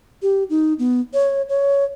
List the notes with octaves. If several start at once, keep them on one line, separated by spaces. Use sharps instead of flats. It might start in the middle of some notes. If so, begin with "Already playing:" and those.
G4
D#4
B3
C#5
C#5